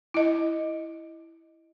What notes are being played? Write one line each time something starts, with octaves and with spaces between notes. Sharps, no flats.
E4 D#5